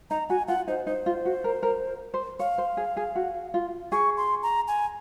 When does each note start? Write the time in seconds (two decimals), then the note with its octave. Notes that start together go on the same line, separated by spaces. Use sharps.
0.10 D#4 A#5
0.29 F#4 G#5
0.48 F4 F#5
0.68 D#4 C5
0.87 D#4 C5
1.06 F4
1.25 F#4
1.44 A#4
1.63 A#4
2.14 C5
2.39 C#5 F5
2.58 C5
2.77 G#4
2.97 G#4
3.15 F#4
3.54 F4
3.92 G#4 C#6
4.17 C6
4.43 A#5
4.68 G#5